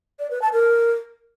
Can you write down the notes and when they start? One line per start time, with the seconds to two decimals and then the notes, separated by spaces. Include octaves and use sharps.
0.19 D5
0.31 B4
0.42 A5
0.53 A#4